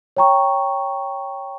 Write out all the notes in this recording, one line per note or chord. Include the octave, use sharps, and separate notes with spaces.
C#5 G5 A#5 C#6